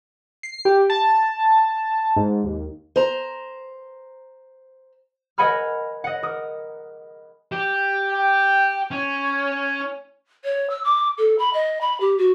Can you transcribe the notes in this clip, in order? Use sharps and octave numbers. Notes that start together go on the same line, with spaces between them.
C7
G4
A5
G#2
D#2
C5 A#5
A#4 D#5 F#5 G#5 B5 F6
D#5 F#5
A#4 D#6
G4
G5
C#4 G#5
C#5
E6
D6
A4
B5
D#5
B5
G4
F#4